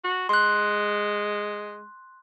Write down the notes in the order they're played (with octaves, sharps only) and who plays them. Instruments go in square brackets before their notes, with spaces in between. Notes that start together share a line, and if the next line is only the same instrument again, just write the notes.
[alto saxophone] F#4
[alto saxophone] G#3 [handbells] C6 F#6